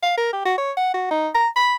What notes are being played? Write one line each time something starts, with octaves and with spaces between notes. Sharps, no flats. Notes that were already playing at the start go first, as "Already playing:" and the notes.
F5
A#4
G4
F#4
C#5
F#5
F#4
D#4
A#5
B5